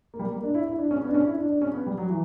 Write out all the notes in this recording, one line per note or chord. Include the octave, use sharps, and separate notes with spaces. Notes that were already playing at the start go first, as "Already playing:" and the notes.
A#3
G3
A#3
D4
E4
E4
D4
C#4
B3
D4
C#4
E4
D4
D4
C#4
B3
G3
F#3
E3